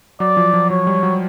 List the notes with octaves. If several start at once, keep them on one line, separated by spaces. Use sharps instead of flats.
F#3 D5
F3
F3
F#3 C#5
G3
F#3